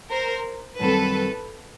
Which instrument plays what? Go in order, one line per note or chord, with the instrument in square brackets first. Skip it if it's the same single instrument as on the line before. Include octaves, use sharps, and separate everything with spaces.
[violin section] A#4 C5
[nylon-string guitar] F#2 D#3 G3 C4 [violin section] A4 B4